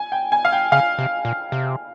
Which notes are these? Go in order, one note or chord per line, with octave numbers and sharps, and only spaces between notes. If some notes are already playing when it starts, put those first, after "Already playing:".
Already playing: G#5
G5
G#5
F5
G5
C#3 F5
C3
A#2
C3